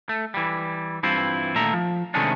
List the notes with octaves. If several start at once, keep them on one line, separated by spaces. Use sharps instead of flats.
A3
E3 G3
G2 E3 C4 E4 F4
A#2 D#3 A3 E5 A#5
F3
C3 D#3 G#3 A3 C#4 D4